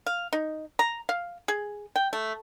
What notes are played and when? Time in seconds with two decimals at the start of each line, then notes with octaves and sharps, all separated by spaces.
0.06 F5
0.33 D#4
0.79 A#5
1.09 F5
1.48 G#4
1.96 G5
2.13 A3